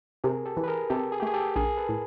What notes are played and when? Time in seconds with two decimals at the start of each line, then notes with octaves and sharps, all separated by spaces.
0.24 C3 G#4 A#4
0.46 G4 A4
0.57 E3
0.64 B4
0.68 G#4 A#4
0.90 C3 G4 A4
1.12 G#4
1.20 G4
1.22 A3 G#4
1.34 G4 A4
1.56 A#1 G#4 A#4
1.77 A4 B4
1.89 A2